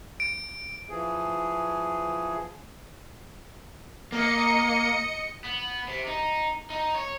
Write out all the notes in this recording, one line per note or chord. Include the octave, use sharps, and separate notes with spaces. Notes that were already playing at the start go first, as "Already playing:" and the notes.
D7
E3 F3 G#4
A#3 D#5 C#7
B3
C3
D#4
D#4
C#5